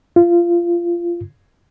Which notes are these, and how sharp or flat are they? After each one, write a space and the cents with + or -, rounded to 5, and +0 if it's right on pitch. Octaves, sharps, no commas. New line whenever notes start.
F4 -20